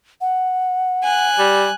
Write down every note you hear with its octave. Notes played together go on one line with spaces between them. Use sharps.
F#5
G#5 F#6
G3